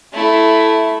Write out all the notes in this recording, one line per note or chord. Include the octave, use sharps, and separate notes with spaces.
A3 E4